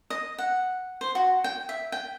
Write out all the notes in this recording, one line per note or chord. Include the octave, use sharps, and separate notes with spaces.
D#5
F#5
C5
F#4
G5
E5
G5